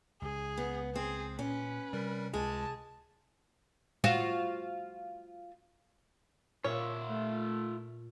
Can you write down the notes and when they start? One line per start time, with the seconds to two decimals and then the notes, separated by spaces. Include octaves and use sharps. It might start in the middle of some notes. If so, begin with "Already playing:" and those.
0.22 C#2 G#4
0.57 B3
0.95 C4 G#4
1.39 A#2 C#4 B4
1.93 C3 G3 A#4
2.34 C#2 G#3 G#4 A5
4.04 F4 F#4 C5
6.64 A#2 F4 C#5 E5
7.08 A3